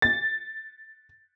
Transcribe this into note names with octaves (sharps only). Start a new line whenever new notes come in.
A6